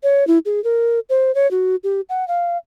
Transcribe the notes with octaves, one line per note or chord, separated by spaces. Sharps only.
C#5
E4
G#4
A#4
C5
C#5
F#4
G4
F#5
F5